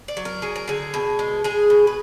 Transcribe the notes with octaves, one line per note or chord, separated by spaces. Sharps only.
D5
F#3
A#4
F#3 G#4
A#4
D3 G#4
B2
G#3
G#3 G#4
B2
B4